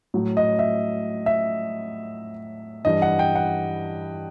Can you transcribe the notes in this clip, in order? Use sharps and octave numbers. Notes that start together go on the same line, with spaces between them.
A2 F#3
D#5
E5
E5
G2 E3 G3 D#5
F#5
G5
F#5